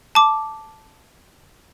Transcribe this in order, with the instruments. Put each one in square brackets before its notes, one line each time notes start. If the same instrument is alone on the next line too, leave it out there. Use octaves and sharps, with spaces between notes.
[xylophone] A5 D6